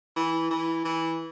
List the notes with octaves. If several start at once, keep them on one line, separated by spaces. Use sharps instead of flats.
E3
E3
E3